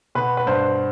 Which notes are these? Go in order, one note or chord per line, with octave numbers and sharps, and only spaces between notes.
B2 B4
B4
G2 C5